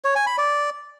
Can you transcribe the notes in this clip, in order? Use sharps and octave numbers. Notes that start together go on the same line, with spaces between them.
C#5
G#5
B5
D5